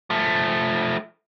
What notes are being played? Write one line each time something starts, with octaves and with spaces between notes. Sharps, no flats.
F3 A3